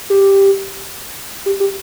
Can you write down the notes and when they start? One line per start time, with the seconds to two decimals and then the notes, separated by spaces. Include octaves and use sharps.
0.10 G4
1.46 G4
1.60 G4